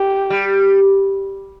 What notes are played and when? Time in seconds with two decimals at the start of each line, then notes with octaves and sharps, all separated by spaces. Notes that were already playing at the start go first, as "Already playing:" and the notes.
Already playing: G4
0.30 G3